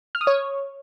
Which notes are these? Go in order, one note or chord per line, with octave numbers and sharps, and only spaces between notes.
F6
D#6
C#5